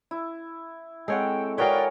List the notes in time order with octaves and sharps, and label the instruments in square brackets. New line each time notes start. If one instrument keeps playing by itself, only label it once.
[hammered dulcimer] E4
[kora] G#3 C#5 F#5 [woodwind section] C4 G5 [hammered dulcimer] A4
[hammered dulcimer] F#4 G#4 C#5 [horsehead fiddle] A#4 G5 [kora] B4 F5 [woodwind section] D5